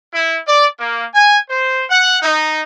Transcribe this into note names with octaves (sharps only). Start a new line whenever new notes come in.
E4
D5
A#3
G#5
C5
F#5
D#4